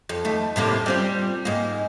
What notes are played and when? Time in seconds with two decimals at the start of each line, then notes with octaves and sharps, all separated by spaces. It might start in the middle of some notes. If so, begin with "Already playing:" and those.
0.09 F2
0.25 D#2 A3
0.56 A2 C3 A#3
0.86 G3 C4 F4
1.45 G#2 A#3